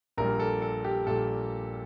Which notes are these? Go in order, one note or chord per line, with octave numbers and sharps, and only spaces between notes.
A#1 A#2 G3 A#4
A4
A4
G4
A#1 A#2 G3 A4